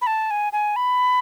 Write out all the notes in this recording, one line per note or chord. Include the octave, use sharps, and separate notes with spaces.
B5
A5
G#5
G#5
B5